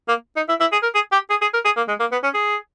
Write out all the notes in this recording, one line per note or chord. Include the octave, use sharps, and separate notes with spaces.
A#3
D#4
E4
E4
G#4
A#4
G#4
G4
G#4
G#4
A#4
G#4
A#3
G#3
A#3
B3
C#4
G#4